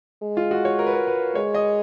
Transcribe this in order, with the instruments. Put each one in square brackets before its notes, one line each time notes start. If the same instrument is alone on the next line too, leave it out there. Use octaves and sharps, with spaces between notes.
[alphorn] G#3
[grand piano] F4
F#4
C#5
A#4
B4
A#4
B4
[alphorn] G#3 [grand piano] C#5
[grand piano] D#5